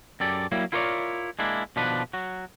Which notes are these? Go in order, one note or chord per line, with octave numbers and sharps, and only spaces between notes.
F#2 G4 A4 D5
F#3 G3 A#3 E4
E4 F4 A#4 B4 C#5 D5
G#3 A#3 D4 E4
B2 D#3 F3 D4 B4
F#3 F#4